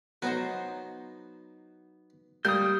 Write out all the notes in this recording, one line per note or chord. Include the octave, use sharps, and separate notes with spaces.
F#3 B3 D#4 C5
G3 A#3 C6 D#6 G6